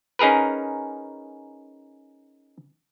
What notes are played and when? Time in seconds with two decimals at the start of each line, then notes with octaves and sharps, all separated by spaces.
0.19 C#4 D#4 G#4 A#4 B4